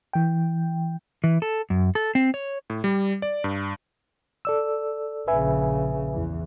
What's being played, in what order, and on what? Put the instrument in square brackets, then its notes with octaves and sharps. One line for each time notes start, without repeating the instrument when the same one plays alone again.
[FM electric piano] E3 G5
[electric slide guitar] E3
A4
F#2
A4
C4
C#5
[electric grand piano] A2
G3
D5
G2
[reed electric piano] A4 D5 E6
[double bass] A#1 C#3 [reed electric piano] B4 E5 G#5
[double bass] E2 E3